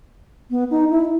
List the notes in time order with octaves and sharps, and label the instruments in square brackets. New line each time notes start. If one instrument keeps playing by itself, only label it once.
[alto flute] B3
D#4
E4